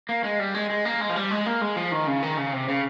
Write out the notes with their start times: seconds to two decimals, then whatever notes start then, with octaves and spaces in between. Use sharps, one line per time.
0.09 A#3
0.24 G#3
0.39 G3
0.54 G#3
0.70 G#3
0.85 A#3
1.01 G#3
1.09 F3
1.16 G3
1.31 G#3
1.46 A#3
1.61 G#3
1.76 F3
1.92 D#3
2.07 C#3
2.23 D#3
2.37 C#3
2.53 C3
2.68 C#3